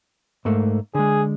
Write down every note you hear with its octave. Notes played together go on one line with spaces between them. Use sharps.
G#2 A3 A#3
D3 G#3 G#4